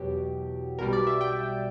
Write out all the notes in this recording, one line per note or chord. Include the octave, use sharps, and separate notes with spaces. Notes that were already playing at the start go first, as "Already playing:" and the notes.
Already playing: E2 B2 F#3 G4
B1 B2 G3 A#4
D5
E5
G5